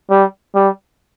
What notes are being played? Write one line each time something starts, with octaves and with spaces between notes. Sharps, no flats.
G3
G3